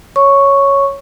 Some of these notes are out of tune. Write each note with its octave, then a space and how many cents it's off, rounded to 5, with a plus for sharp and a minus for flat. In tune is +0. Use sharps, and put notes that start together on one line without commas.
C#5 +0 C#6 +0